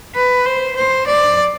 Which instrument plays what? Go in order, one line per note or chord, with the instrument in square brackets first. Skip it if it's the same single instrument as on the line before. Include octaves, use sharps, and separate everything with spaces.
[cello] B4
C5
C5
D5